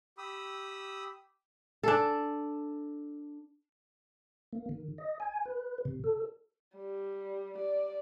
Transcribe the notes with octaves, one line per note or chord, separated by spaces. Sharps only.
G4 B5 D#6 E6
D4 A4
A#3
D#3
D#5
G#5
B4
C3
A4
G3
D5